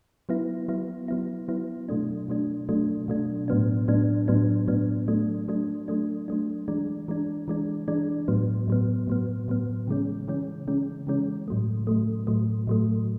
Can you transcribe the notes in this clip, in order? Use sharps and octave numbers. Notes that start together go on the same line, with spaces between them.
F#3 B3 E4
F#3 B3 E4
F#3 B3 E4
F#3 B3 E4
B2 F#3 A3 D4
B2 F#3 A3 D4
B2 F#3 A3 D4
B2 F#3 A3 D4
A2 F#3 B3 D4
A2 F#3 B3 D4
A2 F#3 B3 D4
A2 F#3 B3 D4
F#3 A3 D4
F#3 A3 D4
F#3 A3 D4
F#3 A3 D4
E3 G#3 D4
E3 G#3 D4
E3 G#3 D4
E3 G#3 D4
A2 F#3 B3
A2 F#3 B3
A2 F#3 B3
A2 F#3 B3
C#3 E3 G#3 C#4
C#3 E3 G#3 C#4
C#3 E3 G#3 C#4
C#3 E3 G#3 C#4
A2 F#3 A3
A2 F#3 A3
A2 F#3 A3
A2 F#3 A3